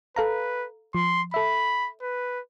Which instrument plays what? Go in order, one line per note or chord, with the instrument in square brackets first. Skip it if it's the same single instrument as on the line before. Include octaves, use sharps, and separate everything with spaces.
[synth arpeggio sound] A4 F5 A#5 [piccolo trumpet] B4
[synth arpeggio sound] F3 [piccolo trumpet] C6
[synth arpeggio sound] A4 E5 [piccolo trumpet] B5
[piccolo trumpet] B4